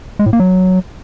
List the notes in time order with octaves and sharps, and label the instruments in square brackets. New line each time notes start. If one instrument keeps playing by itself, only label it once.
[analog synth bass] G#3
A2
A#3
F#3